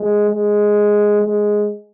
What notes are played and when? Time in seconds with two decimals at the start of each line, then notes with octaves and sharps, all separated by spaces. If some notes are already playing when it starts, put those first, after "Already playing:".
Already playing: G#3
0.29 G#3
1.22 G#3